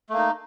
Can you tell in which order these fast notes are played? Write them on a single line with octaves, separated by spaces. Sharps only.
A3 A#3 D#4